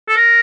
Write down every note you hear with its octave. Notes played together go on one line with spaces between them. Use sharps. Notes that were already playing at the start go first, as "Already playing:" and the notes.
A4
A#4